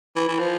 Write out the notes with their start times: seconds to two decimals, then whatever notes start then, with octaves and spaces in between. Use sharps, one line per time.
0.16 E3
0.28 E3
0.39 F3